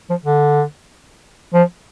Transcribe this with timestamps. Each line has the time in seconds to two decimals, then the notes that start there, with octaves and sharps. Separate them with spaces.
0.10 F3
0.25 D3
1.53 F3